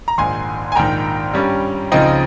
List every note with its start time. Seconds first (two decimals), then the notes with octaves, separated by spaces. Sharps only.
0.08 A#5
0.18 A#1 G#2 D#3 G#5 C6
0.72 G#5
0.76 A#1 G#2 D#3 G5 A#5
1.33 G2 G3 C#4
1.92 C#2 C#3 F3 C4 D#4 D#5 G5